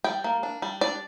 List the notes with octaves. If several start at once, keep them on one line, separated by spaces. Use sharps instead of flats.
G3 G5
A#3
D4
G3
D4 D5